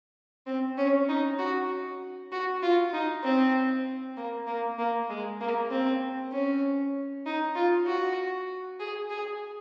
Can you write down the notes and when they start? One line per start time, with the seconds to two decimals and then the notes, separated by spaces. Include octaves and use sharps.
0.47 C4
0.78 C#4
1.09 D#4
1.38 F#4
2.32 F#4
2.62 F4
2.93 D#4
3.23 C4
4.17 A#3
4.47 A#3
4.79 A#3
5.09 G#3
5.41 A#3
5.70 C4
6.32 C#4
7.26 D#4
7.55 F4
7.87 F#4
8.80 G#4
9.10 G#4